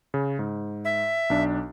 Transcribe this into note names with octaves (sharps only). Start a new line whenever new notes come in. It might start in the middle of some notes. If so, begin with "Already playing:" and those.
C#3
G#2
E5
B1 D4